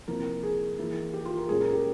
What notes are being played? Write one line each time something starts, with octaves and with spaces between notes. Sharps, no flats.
C3 F3 A#3 E4 A#4
G#4
E3 A#3 E4
G4
F4
A#4
A#2 G#3 C#4 G#4
A#4
G4